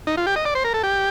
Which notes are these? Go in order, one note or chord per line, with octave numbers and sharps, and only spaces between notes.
D#4
F4
G4
D#5
D5
C5
A#4
A4
G4